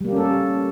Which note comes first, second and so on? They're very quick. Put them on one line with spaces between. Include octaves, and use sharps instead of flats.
G3 A#3 G4 C#4 A4